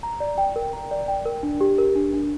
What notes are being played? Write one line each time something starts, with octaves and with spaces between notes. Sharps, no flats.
A#5
D5
G5
A#4
A#5
D5
G5
A#4
D4
G4
A#4
D4
D4